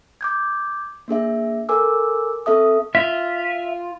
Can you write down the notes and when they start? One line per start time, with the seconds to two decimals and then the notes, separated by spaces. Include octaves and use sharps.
0.21 D6 G6 G#6
1.08 A#3 D4 G#4 E5
1.69 A4 A#4 G#5 D6 E6
2.46 C4 A4 E5 D#6
2.95 F4 E5